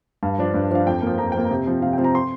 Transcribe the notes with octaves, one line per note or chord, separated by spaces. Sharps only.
G2 F5
F3 D4
G2
F3 D4 F5
F2 G5
F3 A#3
F2 A#5
F3 A#3 G5
A#5
C3
F3 C4
C3 F5
G5
F3 C4
A#5
C6